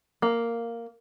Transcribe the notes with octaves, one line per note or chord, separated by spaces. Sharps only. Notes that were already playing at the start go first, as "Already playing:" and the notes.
A#3